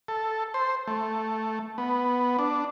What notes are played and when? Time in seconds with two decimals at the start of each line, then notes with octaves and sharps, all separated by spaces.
0.08 A4
0.54 C5
0.87 A3
1.78 B3
2.39 D4